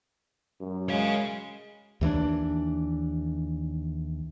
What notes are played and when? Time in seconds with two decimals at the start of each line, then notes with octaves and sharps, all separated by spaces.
0.60 F#2
0.89 G#3 C#5 F5
2.01 D#2 E3 A#3 D4